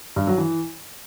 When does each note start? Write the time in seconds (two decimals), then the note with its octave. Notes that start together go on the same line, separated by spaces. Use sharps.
0.16 G2
0.27 F#3
0.38 E3